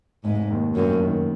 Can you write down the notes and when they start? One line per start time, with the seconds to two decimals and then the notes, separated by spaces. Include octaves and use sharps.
0.24 F1 G#2
0.50 D#2 D#3
0.75 F1 F#2
1.01 D#2 D#3